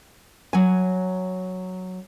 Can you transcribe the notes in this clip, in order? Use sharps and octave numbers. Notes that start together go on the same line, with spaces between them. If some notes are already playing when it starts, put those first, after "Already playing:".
F#3 G#5